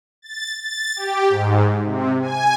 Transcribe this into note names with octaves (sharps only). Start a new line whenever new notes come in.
A6
A6
G4
G#2
C3
G#5